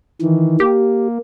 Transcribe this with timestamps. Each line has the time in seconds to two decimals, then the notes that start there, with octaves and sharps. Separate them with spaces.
0.22 D#3 E3
0.60 A#3 G4